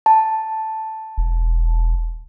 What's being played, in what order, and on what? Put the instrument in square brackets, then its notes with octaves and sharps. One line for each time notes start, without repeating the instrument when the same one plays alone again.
[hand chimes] A5
[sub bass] E1